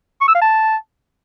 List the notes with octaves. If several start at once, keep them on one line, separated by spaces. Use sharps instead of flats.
C#6
E6
F5
A5